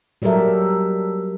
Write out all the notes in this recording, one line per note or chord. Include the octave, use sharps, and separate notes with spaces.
F#3 G3 G4 A4 A#4 E5